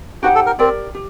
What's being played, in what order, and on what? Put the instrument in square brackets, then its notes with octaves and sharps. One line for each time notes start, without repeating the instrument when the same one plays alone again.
[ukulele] D#4 G4 C5 F#5 [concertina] F#4
[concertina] A4
A#4
[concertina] C4 [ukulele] G4 A#4 D5
[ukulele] G4